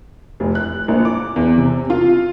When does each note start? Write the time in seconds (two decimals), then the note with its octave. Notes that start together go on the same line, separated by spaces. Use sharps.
0.40 F1
0.55 F#6
0.88 A#1
1.05 D6
1.36 E2
1.58 C3
1.90 F4